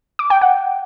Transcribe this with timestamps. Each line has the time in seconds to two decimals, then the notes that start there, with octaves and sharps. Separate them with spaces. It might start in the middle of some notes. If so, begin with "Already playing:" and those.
0.19 D6
0.30 G5
0.41 F#5